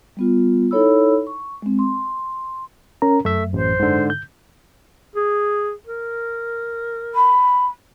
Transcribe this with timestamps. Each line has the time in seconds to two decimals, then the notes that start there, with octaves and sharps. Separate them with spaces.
0.17 G3 B3 F4
0.71 D#4 E4 A4 C#5 B5 E6
1.27 C#6
1.62 G#3 C4
1.79 C6
3.02 C#4 A#4 A#5
3.25 F#2 A3 E5
3.53 A1 C5
3.79 G#2 D3
4.10 G6
5.16 G#4
5.87 A#4
7.14 B5